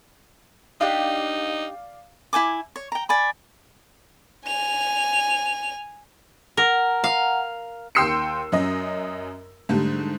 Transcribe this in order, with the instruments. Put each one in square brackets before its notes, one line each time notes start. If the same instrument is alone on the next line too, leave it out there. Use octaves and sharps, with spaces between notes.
[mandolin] D4 G4 [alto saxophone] D#4 [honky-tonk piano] D5 F5
[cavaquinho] E4 C5 G#5 D6
C#5
G5 A#5
D5 G#5 B5
[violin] G#5 F7
[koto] A#4 [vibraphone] F#5 A#5
[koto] F5
[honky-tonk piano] D#2 G5 C6 E6 C7 C#7
F#2 F#3 C#4 D#5
G#2 D3 G3 A3